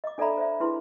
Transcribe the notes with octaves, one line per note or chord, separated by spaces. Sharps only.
D#5 D6
D4 A4 D5 E5 A#5 B5
C5 E5
D4 E4 G#4 B4 C6